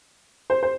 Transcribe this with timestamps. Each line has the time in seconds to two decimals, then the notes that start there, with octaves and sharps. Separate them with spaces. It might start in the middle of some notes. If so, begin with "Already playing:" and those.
0.50 C5
0.63 C5